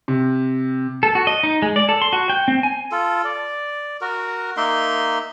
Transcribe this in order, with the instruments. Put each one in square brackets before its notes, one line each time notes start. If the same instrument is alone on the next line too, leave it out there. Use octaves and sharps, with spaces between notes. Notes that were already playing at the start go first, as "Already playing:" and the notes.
[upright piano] C3
[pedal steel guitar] A4
F#4
D#5
D#4
G#3
D5
A4
C6
F#4
G5
C4
G#5
[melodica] F4 A4
D5
F#4 A#4
A#3 D#4 E5 C6